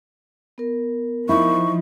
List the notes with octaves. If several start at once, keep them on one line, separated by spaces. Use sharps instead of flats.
B3 A#4
F3 D#4 E4 C#6